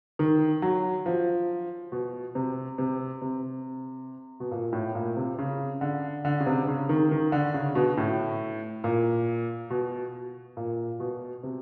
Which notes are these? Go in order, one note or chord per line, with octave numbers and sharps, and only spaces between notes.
D#3
F#3
F3
B2
C3
C3
C3
B2
A#2
A2
A#2
C3
C#3
D3
D3
C#3
C3
C#3
D#3
D#3
D3
C#3
B2
A2
A#2
B2
A#2
B2
C3